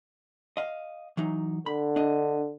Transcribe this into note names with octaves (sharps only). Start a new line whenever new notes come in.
D#5 F5
E3 F#3 D#4
D3 B5
D4 D#5